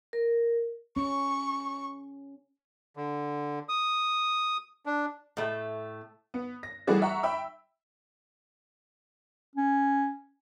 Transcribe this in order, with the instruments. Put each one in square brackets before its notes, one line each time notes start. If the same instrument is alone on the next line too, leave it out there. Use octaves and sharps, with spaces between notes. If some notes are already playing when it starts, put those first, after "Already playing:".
[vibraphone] A#4
[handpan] C#4 [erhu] C#6
[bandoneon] D3
D#6
D4
[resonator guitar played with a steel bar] A2 A3
[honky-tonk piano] B3
A#6
E3 G3 A3 F#4 G#4 D5
E5 F#5 A#5 C#6
E5 G5 B5 E6
[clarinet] C#4